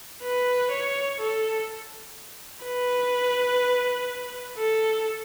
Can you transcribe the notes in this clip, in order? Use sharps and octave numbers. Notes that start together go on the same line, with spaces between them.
B4
C#5
A4
B4
A4